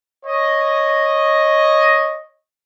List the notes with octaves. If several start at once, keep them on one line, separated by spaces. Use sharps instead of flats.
C#5 D#5